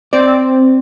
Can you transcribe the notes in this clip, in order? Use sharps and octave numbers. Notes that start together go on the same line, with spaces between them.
C4 D5